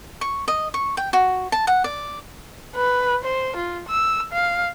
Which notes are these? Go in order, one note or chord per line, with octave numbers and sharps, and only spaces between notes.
C#6
D#5
C#6
G5
F#4
A5
F#5
D5
B4
C5
F4
E6
F5